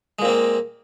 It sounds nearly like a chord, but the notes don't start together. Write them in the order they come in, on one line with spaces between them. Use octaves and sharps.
G#3 A#2 C4 A#3